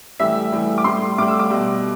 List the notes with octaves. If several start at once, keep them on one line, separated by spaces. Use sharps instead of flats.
A2 E3 G3 E5
A2 E3 G3
D6
A2 G3 C6
A2 G3 D6
E6
D6
B2 G3